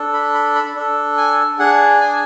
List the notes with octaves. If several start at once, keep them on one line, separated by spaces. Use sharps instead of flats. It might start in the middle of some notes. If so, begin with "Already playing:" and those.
Already playing: D4 A4
B5
B5
B5
D4 A4
G#5
D4 G#4 F#5
G#5